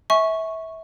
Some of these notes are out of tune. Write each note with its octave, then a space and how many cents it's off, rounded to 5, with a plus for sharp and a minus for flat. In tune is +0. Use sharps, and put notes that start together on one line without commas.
E5 -25 G#5 +15 C#6 -5